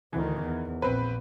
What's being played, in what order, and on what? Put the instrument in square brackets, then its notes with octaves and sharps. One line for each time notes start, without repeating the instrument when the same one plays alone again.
[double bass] D2 D#3 [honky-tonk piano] E3
[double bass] E2
[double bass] A#1 [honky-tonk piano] C4 B4